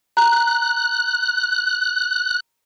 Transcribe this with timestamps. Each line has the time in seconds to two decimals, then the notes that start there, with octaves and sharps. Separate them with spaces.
0.17 A#5 F#6